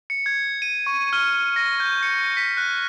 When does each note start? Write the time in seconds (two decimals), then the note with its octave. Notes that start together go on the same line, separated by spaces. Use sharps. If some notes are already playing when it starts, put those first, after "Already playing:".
0.10 C#7
0.26 G#6
0.62 D#7
0.86 C#6
1.13 F6
1.33 F6
1.56 A#6
1.80 G6
2.03 C#7
2.37 B6
2.57 F#6